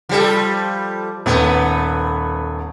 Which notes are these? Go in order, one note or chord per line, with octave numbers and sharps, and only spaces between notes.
F3 G3 A4
D#1 A3 B3